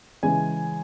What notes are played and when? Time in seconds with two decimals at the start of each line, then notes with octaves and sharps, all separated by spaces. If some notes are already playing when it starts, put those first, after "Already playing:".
0.23 C#3 E3 G#3 G#5